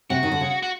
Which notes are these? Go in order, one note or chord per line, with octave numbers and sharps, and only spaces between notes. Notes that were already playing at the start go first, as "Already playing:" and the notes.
C3 F#4
D#3
D3
C#3
F#4